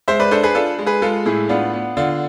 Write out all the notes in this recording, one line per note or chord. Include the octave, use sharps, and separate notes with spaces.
G#3 C5 E5
B4 D5
D4 A4 C5
G#4 B4
D4 F4 A4
G#3
G#4 B4
G#3 F4 A4
A2 E4 G#4
B3 D4 F4
B3
D3 D4 F4